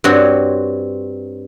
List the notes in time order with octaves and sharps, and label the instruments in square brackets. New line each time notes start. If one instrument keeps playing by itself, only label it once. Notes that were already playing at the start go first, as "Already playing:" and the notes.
[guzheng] G2 C4 F#4 C#5